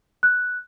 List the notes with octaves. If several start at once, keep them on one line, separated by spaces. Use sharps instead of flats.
F#6